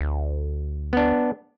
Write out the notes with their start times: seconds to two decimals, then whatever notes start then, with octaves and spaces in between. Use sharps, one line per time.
0.01 D2
0.93 B3 D4